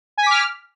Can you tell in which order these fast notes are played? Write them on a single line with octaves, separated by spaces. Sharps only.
G#5 B6 D6 F6